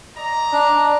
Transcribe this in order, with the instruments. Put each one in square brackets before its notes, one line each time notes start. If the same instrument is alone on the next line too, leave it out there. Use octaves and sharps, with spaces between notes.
[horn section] D5 D#5 A#5
[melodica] D4